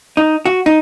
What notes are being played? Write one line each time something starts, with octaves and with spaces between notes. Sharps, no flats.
D#4
F#4
D#4